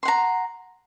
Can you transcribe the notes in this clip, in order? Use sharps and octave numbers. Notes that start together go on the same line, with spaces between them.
F#5 A#5 C6